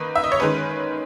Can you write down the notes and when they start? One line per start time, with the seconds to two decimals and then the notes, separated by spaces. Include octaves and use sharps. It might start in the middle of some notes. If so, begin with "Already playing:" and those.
Already playing: D#3 A#3 D#4 B4
0.16 E5
0.24 D#5
0.32 C#5
0.40 D#3 G#3 C#4 B4